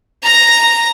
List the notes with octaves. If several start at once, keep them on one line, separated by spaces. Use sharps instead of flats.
A#5 A#6